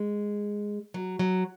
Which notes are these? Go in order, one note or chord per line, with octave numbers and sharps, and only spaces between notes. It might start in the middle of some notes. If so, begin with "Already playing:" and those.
Already playing: G#3
F#3
F#3